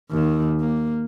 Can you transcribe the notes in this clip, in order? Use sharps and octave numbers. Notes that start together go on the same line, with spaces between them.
D#2 D#3
A#3